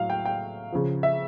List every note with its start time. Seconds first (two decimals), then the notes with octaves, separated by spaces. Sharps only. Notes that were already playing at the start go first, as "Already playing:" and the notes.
Already playing: A2 F#3 F5
0.10 G5
0.25 G5
0.72 C#3 F3
1.03 E5